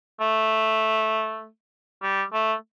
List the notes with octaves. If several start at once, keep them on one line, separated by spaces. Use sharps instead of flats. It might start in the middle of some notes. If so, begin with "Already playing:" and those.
A3
G3
A3